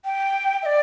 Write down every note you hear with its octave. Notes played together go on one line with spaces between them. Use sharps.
G5
E5
D5